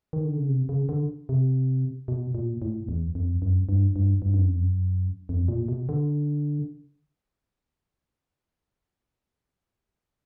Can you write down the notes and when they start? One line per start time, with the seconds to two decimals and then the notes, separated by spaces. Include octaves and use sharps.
0.13 D#3
0.25 D3
0.37 C#3
0.48 C3
0.69 C#3
0.89 D3
1.29 C3
2.08 B2
2.35 A#2
2.62 A2
2.89 E2
3.15 F2
3.42 F#2
3.69 G2
3.96 G2
4.22 G2
4.34 F#2
4.47 F2
4.59 F#2
5.29 F2
5.48 A#2
5.68 B2
5.89 D3